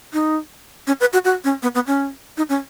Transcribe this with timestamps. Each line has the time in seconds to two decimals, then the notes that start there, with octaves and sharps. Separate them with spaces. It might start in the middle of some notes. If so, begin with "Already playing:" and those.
0.13 D#4
0.87 C#4
1.00 B4
1.13 F#4
1.25 F#4
1.44 C#4
1.63 B3
1.75 B3
1.87 C#4
2.37 D#4
2.49 C#4